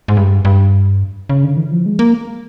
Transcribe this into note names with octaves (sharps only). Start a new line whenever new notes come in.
G#2
G2
G2
C#3
D3
E3
F3
G#3
A#3